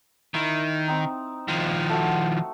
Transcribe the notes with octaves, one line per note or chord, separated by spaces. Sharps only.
D#3 E4
C4 D#4
D#3 F3
A3 F#4